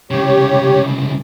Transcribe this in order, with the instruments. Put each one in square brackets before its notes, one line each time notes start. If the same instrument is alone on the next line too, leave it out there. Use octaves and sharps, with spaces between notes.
[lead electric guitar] C2 C#3 [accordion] G4 C#5